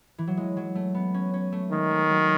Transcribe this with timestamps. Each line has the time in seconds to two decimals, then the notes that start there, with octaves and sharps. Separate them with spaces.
0.18 E3
0.27 F#3
0.37 G#3
0.57 F#3
0.75 A3
0.94 B3
1.14 C#4
1.34 C#4
1.52 A3
1.72 D#3 G#3
1.91 A3
2.10 F#3